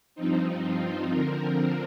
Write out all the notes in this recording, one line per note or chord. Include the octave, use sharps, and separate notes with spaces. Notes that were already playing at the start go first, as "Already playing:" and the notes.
G2 F3 C4 D#4
F4
D3 F3 C4 A#4